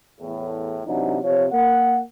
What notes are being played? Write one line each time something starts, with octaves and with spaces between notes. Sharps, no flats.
E2 A2
C3 E3 F#3 D4 D#4
C3 F3 C#5
A#3 F#5